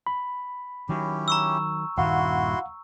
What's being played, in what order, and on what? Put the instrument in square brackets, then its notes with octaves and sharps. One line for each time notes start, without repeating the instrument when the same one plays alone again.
[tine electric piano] B5
[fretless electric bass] D#3 F#3 [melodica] C#4 E4 G4
[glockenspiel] A#5 C#6 E6
[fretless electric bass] D#1 G2 D#3 [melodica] E4 F#4 C6 [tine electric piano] F5 F#5